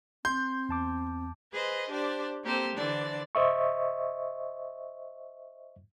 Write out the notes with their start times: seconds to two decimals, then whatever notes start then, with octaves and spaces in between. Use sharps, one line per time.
0.25 C4 C6 G6
0.69 E2 A5 D6
1.52 G#4 B4 C5 D#5
1.90 D4 G4 C5 D5
2.43 A#3 C4 G4 A4 C5
2.76 D3 E3 D4 C5 D5
3.35 C5 D#5 E5 C#6